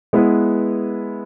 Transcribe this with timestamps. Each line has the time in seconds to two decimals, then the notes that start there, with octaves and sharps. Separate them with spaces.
0.13 G#3 B3 E4 B4